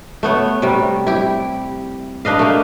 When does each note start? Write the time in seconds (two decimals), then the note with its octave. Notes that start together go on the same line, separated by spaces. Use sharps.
0.23 A3 B3 C#5
0.62 C3 G3
1.07 E4 G4
2.25 D4 B4 D#5 F5
2.39 A3 A#3